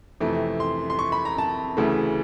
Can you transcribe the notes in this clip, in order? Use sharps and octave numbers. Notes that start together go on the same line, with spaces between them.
F2 C3 E3 A3
C6
C6
C#6
B5
A#5
A5
D2 C#3 E3 A3